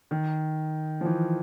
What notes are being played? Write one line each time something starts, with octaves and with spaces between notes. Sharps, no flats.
D#3
F3
E3